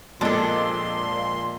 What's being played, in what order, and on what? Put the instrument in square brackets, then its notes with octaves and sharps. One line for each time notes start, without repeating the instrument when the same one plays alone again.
[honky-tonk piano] F2 F3 G#3 [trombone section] A#2 [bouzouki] D4 A4 [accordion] C6